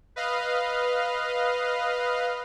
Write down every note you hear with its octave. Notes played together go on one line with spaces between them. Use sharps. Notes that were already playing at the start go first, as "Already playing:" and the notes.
B4 D#5 F5